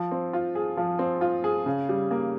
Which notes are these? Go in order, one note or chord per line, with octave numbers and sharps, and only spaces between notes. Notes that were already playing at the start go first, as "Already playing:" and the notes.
Already playing: F3
C4
F4
G#4
F3
C4
F4
G#4
C#3
G3
A#3